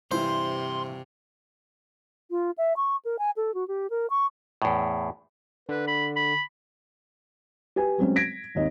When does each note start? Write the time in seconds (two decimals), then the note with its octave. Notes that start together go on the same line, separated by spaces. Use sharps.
0.12 G2 C3 E3 E4 C5 C6
2.31 F4
2.58 E5
2.77 C#6
3.05 A#4
3.19 G#5
3.37 A4
3.54 F#4
3.68 G4
3.90 A#4
4.10 C#6
4.62 E2 A2
5.69 D3 B4
5.88 B5
6.16 B5
7.76 G4 B4 G#5
7.98 F#3 G#3 C4 C#4
8.16 G#6 A#6 B6 D7
8.55 G#1 D#2 D#5